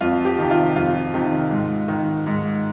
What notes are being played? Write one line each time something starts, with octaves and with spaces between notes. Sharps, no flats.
F2 F4
G4
C3 D#3
F4
F2 F4
C3 D#3
G#2
D#3
G#2